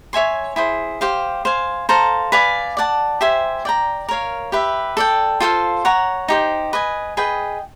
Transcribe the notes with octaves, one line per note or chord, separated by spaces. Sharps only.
C#5 E5 G#5 C6
E4 G#4 C5
G4 C5 F5
C5 F5 G#5
A4 C5 F5 A#5
B4 D5 F5 G#5
D5 F#5 A5
G4 C5 E5 G#5
D5 G5 A#5
A#4 C#5 F5
G4 B4 E5
A4 D5 G5
F4 A4 C5 F5
C#5 F#5 A#5
D#4 G4 C5
B4 D#5 G#5
G#4 B4 D#5 G5